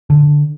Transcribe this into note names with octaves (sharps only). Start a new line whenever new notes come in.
D3